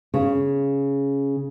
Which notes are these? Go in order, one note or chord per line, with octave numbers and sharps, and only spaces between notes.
C#3